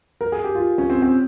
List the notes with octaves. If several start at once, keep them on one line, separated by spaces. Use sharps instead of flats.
A#4
G#4
G4
F4
C#4
C4
C4